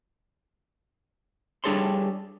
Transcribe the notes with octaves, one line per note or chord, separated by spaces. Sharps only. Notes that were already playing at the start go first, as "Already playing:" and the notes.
G3 D4 G#4 A4 C#5 C6